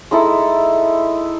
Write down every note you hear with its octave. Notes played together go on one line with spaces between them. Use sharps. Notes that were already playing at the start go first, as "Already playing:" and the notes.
G#3 D#4 E4 A4